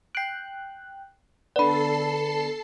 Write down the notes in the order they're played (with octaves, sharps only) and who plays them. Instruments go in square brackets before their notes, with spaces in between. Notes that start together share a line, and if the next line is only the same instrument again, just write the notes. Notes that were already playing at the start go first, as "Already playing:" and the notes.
[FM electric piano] G5 F#6 [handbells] C7 D7
[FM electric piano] D3 B3 [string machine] A4 A5 C7 [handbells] D5 B5